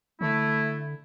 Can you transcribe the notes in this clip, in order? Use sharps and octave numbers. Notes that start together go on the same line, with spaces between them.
D3 A3 E4